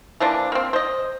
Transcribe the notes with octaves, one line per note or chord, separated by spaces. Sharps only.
E3 F3 A#3 D4
A#3 C4
C5 D#5